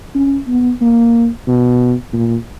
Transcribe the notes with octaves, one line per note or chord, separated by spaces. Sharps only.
C#4
B3
A#3
B2
A#2